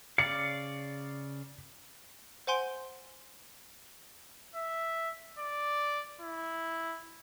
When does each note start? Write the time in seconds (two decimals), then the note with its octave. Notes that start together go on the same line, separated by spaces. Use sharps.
0.18 C#3 D5 F5 C#7
2.47 C5 F#5 G#5 C6 G6 D7
4.55 E5
5.39 D5
6.21 E4